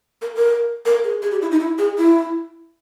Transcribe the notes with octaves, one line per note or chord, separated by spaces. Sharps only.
A#4
A#4
A#4
G#4
G#4
G4
E4
D#4
E4
G#4
E4